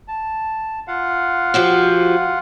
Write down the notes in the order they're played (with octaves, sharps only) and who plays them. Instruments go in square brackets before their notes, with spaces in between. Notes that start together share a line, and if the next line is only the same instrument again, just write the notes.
[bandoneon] A5
F4 F5 F#5
[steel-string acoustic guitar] F3 F#4 G4